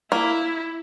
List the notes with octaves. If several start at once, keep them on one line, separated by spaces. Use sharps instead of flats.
A#3 E4